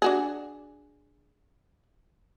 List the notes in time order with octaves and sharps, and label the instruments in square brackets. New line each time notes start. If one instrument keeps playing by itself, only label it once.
[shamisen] D4 F#4 G#4